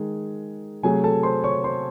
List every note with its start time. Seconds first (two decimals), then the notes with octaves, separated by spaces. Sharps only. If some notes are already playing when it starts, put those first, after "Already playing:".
Already playing: D#3 G#3 G#4
0.83 C3 F#3 A3 G#4 G#5
1.04 A4 A5
1.23 C5 C6
1.44 C#5 C#6
1.64 C5 C6